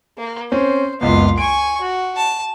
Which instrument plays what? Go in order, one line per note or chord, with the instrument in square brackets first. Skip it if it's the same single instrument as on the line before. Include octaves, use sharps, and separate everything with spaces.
[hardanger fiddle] A#3
[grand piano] C4 C#4 [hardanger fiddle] C5
[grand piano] F#1 C#2 B3 [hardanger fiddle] F4 F5
[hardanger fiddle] G#5 C#6 [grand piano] D7
[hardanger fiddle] F#4
A5